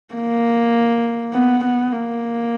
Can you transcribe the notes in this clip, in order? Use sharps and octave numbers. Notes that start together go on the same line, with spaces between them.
A#3
B3
B3
A#3